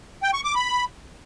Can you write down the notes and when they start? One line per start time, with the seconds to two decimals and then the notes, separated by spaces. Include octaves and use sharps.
0.23 G5
0.34 C#6
0.44 D6
0.55 B5